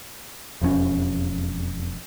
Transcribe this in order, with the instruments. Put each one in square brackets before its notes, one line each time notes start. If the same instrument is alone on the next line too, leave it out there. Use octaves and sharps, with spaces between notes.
[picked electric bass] E1 F2 G#3 C#4